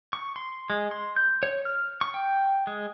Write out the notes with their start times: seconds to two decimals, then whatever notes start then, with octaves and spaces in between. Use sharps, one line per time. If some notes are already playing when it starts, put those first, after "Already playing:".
0.13 C#6
0.36 C6
0.70 G#3
0.91 C6
1.16 G6
1.43 C#5
1.65 F6
2.01 C#6
2.14 G5
2.67 G#3